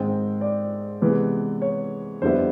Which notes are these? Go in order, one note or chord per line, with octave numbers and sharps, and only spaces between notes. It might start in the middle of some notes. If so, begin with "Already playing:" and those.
Already playing: G#2 D#3 G#3 C4 G5
D5
C3 E3 G#3 B3
C#5
F2 D3 G3 B3 E4 C5